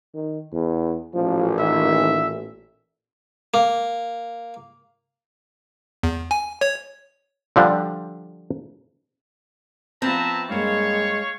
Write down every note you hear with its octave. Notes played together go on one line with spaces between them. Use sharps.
D#3
E2
A1 A#2 F3
D#3 E5
A#3
E2
G#5
C#5
D3 F3 G3 D4
F3 B3 C4 B4 E5 A5 A#5
G2 G#3 A#3 C#5 F5 C#6